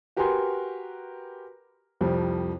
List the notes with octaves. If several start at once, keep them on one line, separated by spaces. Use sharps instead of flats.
F#4 G4 A#4 B4 G#5 C6
C2 F2 F3 G3